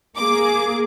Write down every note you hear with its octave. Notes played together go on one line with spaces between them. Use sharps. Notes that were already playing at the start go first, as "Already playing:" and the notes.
A#3 G#4 D6